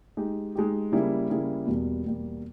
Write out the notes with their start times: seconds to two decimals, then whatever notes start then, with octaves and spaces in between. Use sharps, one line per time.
0.17 G#3 D#4 G4
0.55 G#3 D#4 G4
0.92 C#3 G3 A#3 E4 G#4
1.30 C#3 G3 A#3 E4 G#4
1.67 E2 B2 G3 A#3
2.05 E2 B2 G3 A#3